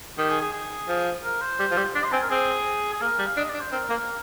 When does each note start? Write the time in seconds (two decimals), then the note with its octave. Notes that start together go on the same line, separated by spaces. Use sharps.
0.18 D#3 G4
0.30 G#4
0.41 G#4
0.53 G#4
0.88 F3
1.24 A#4
1.41 C5
1.59 G3
1.71 F3
1.77 G3
1.95 D4 D5
2.04 C6
2.12 C4 G#5
2.22 A#4
2.30 C4 G#4
2.93 G#4
3.01 A#3 A#4
3.19 G3
3.26 F5
3.37 D4 D#5
3.49 D4 D5
3.61 C5
3.72 C4 A#4
3.90 A#3